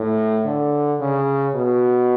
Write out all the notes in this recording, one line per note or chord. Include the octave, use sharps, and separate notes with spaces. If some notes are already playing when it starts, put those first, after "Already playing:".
Already playing: A2
D3
C#3
B2